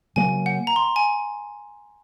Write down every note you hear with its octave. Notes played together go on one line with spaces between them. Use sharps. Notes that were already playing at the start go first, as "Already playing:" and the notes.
C#3 F#3 A#3 G#5
F#5
A#5
C6
G#5